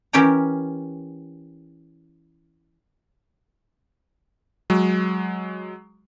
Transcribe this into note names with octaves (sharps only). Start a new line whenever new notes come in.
E3 C#4 G4 A#4 G5 A#5
F#3 G#3